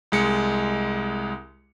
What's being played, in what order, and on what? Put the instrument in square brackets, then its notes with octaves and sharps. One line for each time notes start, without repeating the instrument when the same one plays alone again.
[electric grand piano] C2 G#3 C#7